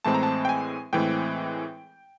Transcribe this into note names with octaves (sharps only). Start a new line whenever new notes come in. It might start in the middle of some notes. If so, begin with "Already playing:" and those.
A2 E3 G#3 C4 A5
A#5
A5
G5
G#5
A2 E3 G#3 C4 G5